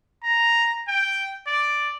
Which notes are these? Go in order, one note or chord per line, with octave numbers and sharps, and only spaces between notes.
A#5
G5
D5